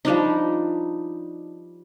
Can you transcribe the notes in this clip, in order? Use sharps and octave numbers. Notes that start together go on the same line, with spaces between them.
F3 G3 D4 D#4